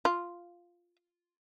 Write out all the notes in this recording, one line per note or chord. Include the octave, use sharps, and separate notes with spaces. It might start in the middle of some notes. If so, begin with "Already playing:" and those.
F4